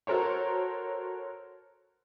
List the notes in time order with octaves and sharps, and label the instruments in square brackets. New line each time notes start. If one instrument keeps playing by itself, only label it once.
[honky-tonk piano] F#4 A4 A#4 C5 C#5